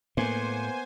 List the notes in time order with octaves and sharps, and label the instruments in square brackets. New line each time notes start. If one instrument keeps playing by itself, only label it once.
[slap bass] A2 [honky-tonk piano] A#3 [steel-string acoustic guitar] B3 [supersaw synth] C5 G#5